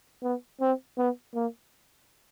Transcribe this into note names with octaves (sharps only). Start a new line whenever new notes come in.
B3
C4
B3
A#3